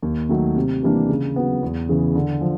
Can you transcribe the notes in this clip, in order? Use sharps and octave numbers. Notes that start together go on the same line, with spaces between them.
D#2
D#3 F#3 A3
C3
E3 G3 A#3 D4
C#3
F#3 B3
E2
C#3 E3
D3
F3